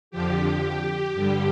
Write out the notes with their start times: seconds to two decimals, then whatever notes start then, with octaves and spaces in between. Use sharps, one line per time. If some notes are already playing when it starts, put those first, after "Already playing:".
0.11 F2 D3 F3 G4
1.14 G2 D3 G3